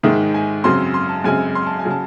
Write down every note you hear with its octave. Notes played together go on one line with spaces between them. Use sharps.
G#2 D#3 G#3 E5
G#5
F#2 C#3 F#3 C4 C6
C6
A5
F#2 C#3 G#3 C4 G#5
C6
A5
G#5
C#3 F#3
A5